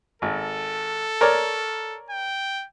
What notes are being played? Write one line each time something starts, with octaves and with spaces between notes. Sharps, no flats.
G#1 A4
A#4 C#5 D5
G5